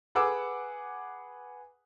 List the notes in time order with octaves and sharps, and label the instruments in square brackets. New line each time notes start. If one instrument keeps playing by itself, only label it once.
[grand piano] G#4 B4 F#5 G#5 D6 E6